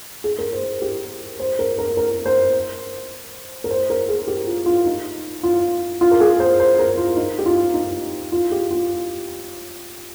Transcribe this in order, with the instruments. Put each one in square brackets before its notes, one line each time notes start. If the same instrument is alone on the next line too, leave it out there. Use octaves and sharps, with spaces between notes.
[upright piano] G#4
A#4
C5
G4
C5
A#4
A#4
A#4
C5
A#4
C5
A#4
G#4
G4
F4
F4
D#4
F4
F4
A#4
G#4
C5
C5
A#4
F4
D#4
G4
F4
D#4
F4
G4
F4